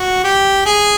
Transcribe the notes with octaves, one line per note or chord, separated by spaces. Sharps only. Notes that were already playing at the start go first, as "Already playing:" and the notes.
Already playing: F#4
G4
G#4